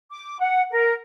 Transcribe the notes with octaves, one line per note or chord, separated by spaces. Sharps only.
D6
F#5
A#4